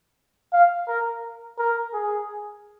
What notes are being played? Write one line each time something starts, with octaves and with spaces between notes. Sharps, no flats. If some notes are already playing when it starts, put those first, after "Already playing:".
F5
A#4
A#4
G#4